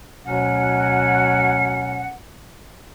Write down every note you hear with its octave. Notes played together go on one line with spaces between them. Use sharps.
D2 B2 F#3 C#4 F#5